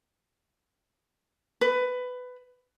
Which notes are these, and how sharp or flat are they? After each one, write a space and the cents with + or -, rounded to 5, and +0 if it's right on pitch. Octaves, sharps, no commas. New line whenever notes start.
B4 +15